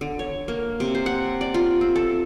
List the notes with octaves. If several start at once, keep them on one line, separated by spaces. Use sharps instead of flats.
D3
C#5
A#3
C3
C5
F#5
D5
F4
C4
A4